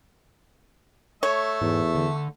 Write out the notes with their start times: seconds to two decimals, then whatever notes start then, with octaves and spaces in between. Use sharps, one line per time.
1.23 A3 C#5 E5
1.61 E2 G#2
1.95 D3